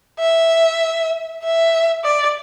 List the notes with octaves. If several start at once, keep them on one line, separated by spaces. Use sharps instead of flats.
E5
E5
D5